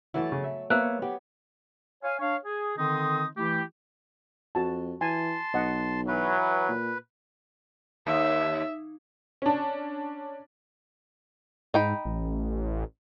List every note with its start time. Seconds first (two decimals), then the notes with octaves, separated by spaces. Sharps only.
0.14 E3 F#3 A3 E4 A5
0.32 C#3
0.44 E5
0.70 A#3 B3 C5 C#5 E5
1.02 B3 G4
2.03 C#5 F5 G#5
2.20 D4 C#5 F5
2.45 G#4
2.77 D3 D#3 C4 D#4 C6 D#6
3.37 E3 A3 E4 G4
4.55 F2 F#4 A5
5.01 E3 G#5 A5 C6
5.54 B1 D#5 F#5
6.08 E3 F#3 B4
6.69 A#2
8.07 D#2 E5
9.42 C#4 D4
11.74 G#2 D#4 G5 B5
12.05 A1